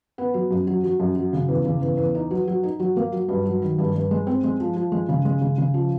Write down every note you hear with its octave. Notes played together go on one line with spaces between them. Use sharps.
B3
F#3
F#2
F#3
F#3
F#2
F#3
C#3
E2
C#3
E2
E2
D#4
F#3
F#3
D#4
F#3
A#3
F#3
G2
F#3
D#3
G2
G2
G#3
C4
G#3
F3
F3
G#3
C#3
G#3
C#3
C#3
F3